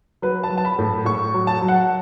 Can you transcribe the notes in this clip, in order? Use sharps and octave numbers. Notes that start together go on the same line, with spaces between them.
F#3 B4
A5
F#3
A5
B5
A2
A2 C#6
F#3
A5
F#3
F#5